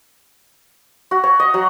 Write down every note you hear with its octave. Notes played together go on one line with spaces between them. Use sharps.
F#4
C#5
D#5
F#3